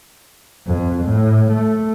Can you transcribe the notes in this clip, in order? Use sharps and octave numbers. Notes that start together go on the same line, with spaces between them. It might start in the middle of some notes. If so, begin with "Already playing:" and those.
F2
A2
A3